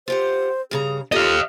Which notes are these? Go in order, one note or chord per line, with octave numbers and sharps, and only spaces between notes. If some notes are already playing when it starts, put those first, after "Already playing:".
F4 G4 C5 F#5
G2 C#3 G#4 A#5
D#4 F4 G4 A4 D#5 F5